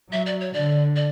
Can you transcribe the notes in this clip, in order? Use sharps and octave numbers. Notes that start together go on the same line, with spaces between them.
F#3 E5
D5
C#5
D3 D5
D5